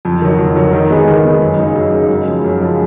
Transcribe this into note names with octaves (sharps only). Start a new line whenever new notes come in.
F2
D#3 F#3
F2
D#3 F#3
D#3
G#3 B3 D#4 G#4
D#3
G#3 B3 D#4 G#4
F#2
C#3 G#3 D#4
F#2
C#3 G#3 D#4
F#2
C#3 F3 G#3
F#2
C#3 F3 G#3